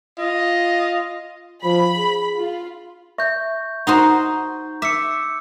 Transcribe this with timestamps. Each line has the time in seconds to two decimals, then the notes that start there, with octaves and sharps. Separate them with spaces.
0.18 F4 D#5
1.64 F3 B5
1.97 G#4
2.39 F4
3.18 E5 C#6 G6
3.87 D#4 F#4 C5 F#5 A#5
4.82 E5 D6 E6 C#7